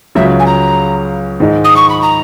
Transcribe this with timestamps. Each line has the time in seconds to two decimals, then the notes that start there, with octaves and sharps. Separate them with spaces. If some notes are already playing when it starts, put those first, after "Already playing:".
0.15 C#2 C#3 F#3 E5
0.39 G#5
0.46 A#5
1.40 G#2 D#3 G#3 D#4
1.64 D#6
1.76 C#6
1.90 B5
2.02 A#5